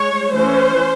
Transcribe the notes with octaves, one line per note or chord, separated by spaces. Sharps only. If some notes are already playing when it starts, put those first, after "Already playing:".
Already playing: G#3 C#5
E3 A3 C#4 C5